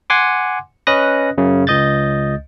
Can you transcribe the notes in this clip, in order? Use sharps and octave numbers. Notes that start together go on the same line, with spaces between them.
F#5 G#5 C6 D6
C#4 B4 D#5 D#6 F#6 A#6
F#2 C#3
C#2 D#5 G6 A6